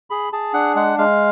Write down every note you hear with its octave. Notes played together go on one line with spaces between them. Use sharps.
G#4 B5
G#4 A5
D4 F#5
G#3 F#5
G#3 F5